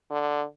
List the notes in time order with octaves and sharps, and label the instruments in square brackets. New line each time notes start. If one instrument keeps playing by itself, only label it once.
[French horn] D3